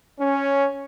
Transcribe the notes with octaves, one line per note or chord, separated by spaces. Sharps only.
C#4